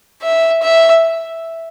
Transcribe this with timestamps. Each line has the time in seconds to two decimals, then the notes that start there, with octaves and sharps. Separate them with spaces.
0.22 E5
0.62 E5